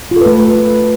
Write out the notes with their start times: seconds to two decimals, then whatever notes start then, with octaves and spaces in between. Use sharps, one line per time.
0.11 F4
0.16 A4
0.21 B4
0.26 A3